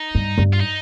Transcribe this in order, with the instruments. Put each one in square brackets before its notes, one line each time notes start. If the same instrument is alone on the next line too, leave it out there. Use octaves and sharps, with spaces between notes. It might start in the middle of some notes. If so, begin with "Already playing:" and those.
Already playing: [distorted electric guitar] D#4
[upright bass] G2
G2
[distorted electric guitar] F4
D#4